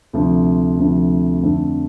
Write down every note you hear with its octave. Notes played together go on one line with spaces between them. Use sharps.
D2 C3 F3
D2 C3 F3
F2 D3 A3